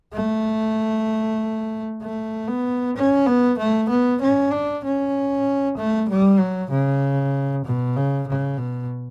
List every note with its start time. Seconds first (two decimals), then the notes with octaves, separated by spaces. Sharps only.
0.14 A3
2.03 A3
2.48 B3
2.96 C#4
3.26 B3
3.58 A3
3.89 B3
4.21 C#4
4.52 D4
4.84 C#4
5.77 A3
6.09 G3
6.39 F#3
6.71 C#3
7.65 B2
7.97 C#3
8.27 C#3
8.58 B2